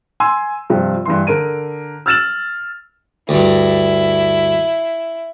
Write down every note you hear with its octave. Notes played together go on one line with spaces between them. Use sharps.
G#5 C6 E6
G2 C3 F3
G2 E3 C6
D3 A#4 D7 D#7
E6 F6 A6 E7 F#7
D2 G2 E4